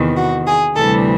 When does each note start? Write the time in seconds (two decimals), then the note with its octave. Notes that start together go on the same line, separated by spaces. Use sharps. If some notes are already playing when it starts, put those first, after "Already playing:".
Already playing: E2 C3 D#3
0.16 F#4
0.46 G#4
0.76 D2 C3 E3 G3 A4